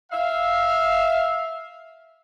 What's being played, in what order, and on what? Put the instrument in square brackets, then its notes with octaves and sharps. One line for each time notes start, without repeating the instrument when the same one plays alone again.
[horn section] E5 F5